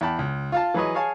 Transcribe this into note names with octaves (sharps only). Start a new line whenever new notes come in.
E2 G5 A5 B5
C#2
F4 F5 A5
E3 F#3 G#4 B4 C#5 D#5
G#4 C#5 F5 G#5 A5